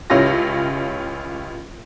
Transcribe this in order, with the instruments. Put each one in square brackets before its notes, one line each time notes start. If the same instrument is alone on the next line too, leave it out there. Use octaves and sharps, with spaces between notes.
[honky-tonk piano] C#2 C#4 E4 F4 G4 A#6